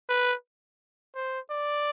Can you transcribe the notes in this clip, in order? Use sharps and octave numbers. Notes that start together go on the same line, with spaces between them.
B4
C5
D5